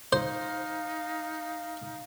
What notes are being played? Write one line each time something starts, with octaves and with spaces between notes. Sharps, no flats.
D#4 C5 F5